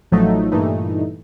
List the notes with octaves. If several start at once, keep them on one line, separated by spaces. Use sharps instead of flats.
A1 F3 F#3 A3 D#4
G2 A#2 E3 A3 D#4